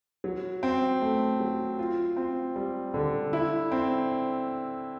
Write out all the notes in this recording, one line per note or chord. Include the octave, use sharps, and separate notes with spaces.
F#3
C4
A3
F#3
F4
C4
G3
D3
E4
C4